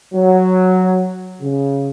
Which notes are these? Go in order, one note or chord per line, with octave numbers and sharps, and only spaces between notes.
F#3
C#3